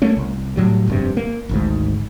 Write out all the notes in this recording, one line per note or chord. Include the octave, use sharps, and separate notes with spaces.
A3 A#3 C#4
C2
A2 F#3 G3
F1 G2 C3
A#3
G#1 D2 G#2